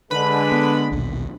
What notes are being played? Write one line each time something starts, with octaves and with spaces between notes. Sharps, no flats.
D3 G#3 B4 B5
B3
A#1 D#2 B2